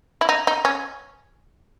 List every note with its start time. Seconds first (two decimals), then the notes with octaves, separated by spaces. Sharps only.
0.21 E4
0.29 D#4
0.47 D#4
0.65 C#4